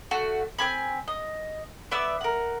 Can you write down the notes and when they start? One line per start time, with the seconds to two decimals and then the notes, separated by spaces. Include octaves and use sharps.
0.11 A3 F#4
0.59 C4 F#4 G#5 B5
1.08 D#5
1.92 B3 D5 E5 E6
2.21 A#4 F#5